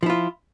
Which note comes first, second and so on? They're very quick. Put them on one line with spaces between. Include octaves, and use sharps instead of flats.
F3 E4 F4